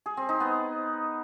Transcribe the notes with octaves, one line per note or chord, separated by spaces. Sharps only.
G#4
C4
D#4
B3